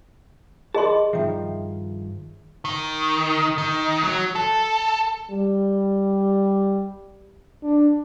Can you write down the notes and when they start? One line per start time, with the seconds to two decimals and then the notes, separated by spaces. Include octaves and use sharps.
0.75 G#4 D5 D#5 A5 C6
1.13 G2 D#3 F3 E5
2.65 D#3
3.58 D#3
4.03 F#3
4.36 A4
5.31 G3
7.63 D4